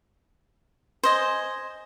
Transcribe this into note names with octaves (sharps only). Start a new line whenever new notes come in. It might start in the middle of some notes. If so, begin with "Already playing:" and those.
C5 D#5 G#5